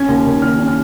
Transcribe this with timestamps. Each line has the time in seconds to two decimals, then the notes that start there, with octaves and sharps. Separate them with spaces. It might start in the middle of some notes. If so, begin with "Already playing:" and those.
Already playing: C#4 G#6
0.08 D#2
0.25 D#3
0.42 D#2 F6
0.59 C#4
0.67 F6